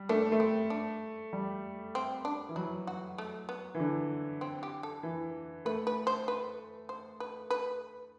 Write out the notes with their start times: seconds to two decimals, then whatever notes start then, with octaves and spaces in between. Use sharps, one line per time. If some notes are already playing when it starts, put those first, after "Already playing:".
Already playing: G3
0.09 A3 D4
0.32 A3
0.40 C4
0.70 D4
1.33 G3
1.95 C4
2.25 D4
2.49 E3
2.56 F#3 E4
2.87 F#4
3.18 A3
3.49 B3
3.75 E3
3.80 D3
4.41 C4
4.63 G4
4.83 A4
5.03 E3
5.65 A3 B4
5.87 B4
6.07 C5
6.28 B4
6.89 C5
7.20 B4
7.50 B4